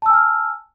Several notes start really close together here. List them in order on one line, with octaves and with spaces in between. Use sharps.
A5 E6 G#5 F6